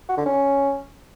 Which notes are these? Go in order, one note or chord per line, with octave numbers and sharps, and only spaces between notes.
F#4
D3
C#4